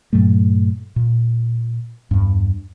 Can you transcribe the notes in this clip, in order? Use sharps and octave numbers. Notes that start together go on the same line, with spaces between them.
G2 A#2 F#3 A3
A#2
E2 G2